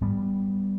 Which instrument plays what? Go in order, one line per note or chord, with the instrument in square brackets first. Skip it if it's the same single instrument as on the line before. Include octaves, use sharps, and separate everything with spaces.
[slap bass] G#2 G3 B3